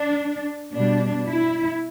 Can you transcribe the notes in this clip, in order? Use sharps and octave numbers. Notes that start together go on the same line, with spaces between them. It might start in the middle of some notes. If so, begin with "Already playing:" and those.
Already playing: D4
B2 G3 D4
E4